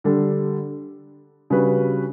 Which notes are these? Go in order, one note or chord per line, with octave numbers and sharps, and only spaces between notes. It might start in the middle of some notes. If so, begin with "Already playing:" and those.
D3 G3 D4 A4
C#3 G3 D4 F#4 B4